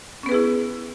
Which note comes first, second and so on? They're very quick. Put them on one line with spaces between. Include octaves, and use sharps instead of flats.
C#4 B3 B4 G#4 E4